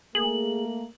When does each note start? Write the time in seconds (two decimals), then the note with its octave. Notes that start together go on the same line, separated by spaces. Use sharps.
0.15 A3 A#3 G#4 F#7